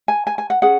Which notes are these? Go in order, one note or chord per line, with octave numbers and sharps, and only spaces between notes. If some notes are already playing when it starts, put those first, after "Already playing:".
G#5
G#5
G#5
F#5
C#4 G#4 F#5